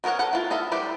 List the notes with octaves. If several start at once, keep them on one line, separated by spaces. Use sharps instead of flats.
D#3 B3 A#4 C#5 F#5
A4 B4 F#5
E4 F4
B3 D#4 A4 E5 F5
G3 E4 G4 C5 G5